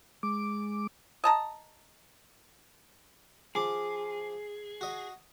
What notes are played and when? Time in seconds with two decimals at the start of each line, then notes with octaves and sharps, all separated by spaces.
0.23 G#3 D6
1.24 D#5 A5 A#5
3.55 F3 G#4 D6
4.81 F#4 D#5